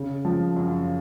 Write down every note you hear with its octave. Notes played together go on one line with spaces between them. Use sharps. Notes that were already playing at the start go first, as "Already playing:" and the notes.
Already playing: C#3
F3
F#2